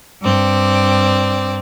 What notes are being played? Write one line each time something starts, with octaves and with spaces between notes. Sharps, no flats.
G2 C4 D5